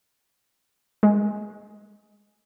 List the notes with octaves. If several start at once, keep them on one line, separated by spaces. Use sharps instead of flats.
G#3